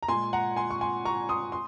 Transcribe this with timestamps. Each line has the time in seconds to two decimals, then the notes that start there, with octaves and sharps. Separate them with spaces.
0.03 A#5
0.08 A#2 G#3 G#5 C6
0.33 F#5 A#5
0.56 G#5 C6
0.70 C#6
0.81 G#5 C6
1.05 A#5 C#6
1.29 C6 D#6
1.52 C6